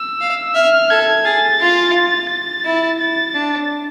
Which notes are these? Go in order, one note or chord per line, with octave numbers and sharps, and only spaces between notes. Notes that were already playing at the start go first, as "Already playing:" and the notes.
Already playing: E6
F5
E5 F6
A4 G#6
G#4 A6
F4
A6
E4
A6
D4